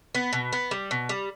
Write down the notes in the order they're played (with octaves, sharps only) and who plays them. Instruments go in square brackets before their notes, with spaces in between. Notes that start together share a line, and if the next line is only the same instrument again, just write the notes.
[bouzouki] B3
B2
B3
G3
B2
G3